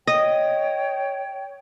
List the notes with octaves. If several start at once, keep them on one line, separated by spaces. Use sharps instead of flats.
C#5 D#5 G5